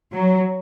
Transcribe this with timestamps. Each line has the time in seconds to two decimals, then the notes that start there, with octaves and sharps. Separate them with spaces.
0.12 F#3